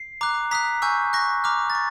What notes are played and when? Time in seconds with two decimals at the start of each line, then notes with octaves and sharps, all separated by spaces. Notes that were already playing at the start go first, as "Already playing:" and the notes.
Already playing: C7
0.21 A#5 D6 F#6
0.51 A#5 D#6 F#6 B6
0.82 G#5 C#6 E6 G6
1.13 C#6 F#6 A#6
1.44 A#5 D6 F6
1.70 A6
1.75 C#6